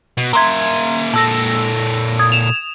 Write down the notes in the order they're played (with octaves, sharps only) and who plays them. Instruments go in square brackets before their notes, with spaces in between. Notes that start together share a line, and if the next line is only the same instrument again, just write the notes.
[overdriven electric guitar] B2
[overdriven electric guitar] A#3 E5 [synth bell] A#5 C6 G#6
[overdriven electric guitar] A#2 A4 [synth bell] A5 E6 A#6
[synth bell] D#6 G#6
E7 F7